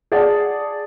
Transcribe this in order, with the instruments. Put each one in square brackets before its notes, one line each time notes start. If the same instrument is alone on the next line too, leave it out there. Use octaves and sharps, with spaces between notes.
[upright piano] G#4 D5 F#5 A5